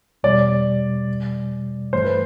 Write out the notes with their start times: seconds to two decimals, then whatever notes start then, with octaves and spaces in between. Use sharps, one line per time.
0.23 E2 B2 G3 D5
1.93 G2 E3 A3 C5
2.04 B4